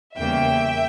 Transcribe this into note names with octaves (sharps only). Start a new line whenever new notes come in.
E2 C#3 G3 A#3 C#4 E5 G5